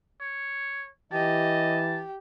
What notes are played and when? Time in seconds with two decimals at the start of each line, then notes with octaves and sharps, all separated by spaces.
0.21 C#5
1.12 E3 G4 D#5 A5